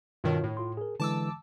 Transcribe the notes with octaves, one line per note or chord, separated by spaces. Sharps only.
G2 B2 D#3 F4 C#5
A2
F4 C6
G#4 A#4
D3 E3 G#3 A5 D6 E6